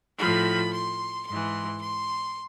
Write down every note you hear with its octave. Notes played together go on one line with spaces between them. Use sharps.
A2 F3 B5
C6
G#2 E3 C6
C6